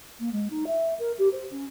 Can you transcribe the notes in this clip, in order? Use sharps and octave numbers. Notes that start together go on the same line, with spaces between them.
A#3
G#3
D#4
E5
A#4
G4
C5
C#4